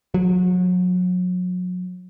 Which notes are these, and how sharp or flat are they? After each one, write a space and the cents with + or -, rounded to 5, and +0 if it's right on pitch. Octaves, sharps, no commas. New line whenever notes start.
F#3 -35